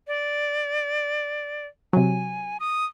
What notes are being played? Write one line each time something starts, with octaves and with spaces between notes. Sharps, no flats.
D5
C3 F#3 G#5
D#6